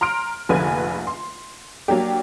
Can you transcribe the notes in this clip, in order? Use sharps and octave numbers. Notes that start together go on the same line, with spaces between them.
A#5 C6 F6 D7
F1 A#1 D3 B4 G#5
C6
F#3 A#3 D4 G4